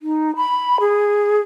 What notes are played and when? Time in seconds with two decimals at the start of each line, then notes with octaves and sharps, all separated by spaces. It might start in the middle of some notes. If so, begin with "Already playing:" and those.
0.01 D#4
0.36 B5
0.80 G#4